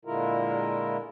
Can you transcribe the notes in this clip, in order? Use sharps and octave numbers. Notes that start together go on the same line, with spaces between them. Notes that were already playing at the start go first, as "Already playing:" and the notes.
A#2 D3 G#3 E4 F4 A#4